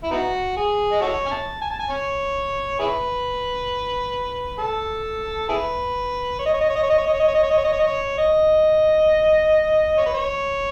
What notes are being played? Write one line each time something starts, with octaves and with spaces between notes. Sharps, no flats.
E4
B3 D#4 F#4
G#4
D#5
F#4 A4 C#5
G#5
A5
G#5
A5
G#5
C#5
E4 G#4 B4
A4
E4 G#4 B4
C#5
D#5
C#5
D#5
C#5
D#5
C#5
D#5
C#5
D#5
C#5
D#5
C#5
D#5
C#5
D#5
C#5
D#5
C#5
D#5
C#5
D#5
C#5
B4
C#5